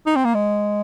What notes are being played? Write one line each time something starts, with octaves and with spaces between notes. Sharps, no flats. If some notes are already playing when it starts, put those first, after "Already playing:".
D#4
C4
A#3
G#3